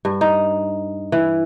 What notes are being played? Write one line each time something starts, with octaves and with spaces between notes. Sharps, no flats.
G2
D#4
E3